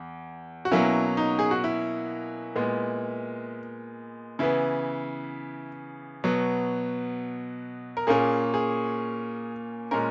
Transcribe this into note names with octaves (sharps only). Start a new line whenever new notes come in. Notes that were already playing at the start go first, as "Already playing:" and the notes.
Already playing: E2
F#4
B2 F#3 A#3 C#4 E4
D#4
G#4
F#4
E4
A#2 G#3 B3
C#3 E3 B3 E4
B2 F#3 B3
A#4
A#2 A#3 C#4 G#4
G#4
A#2 G#3 C#4 A#4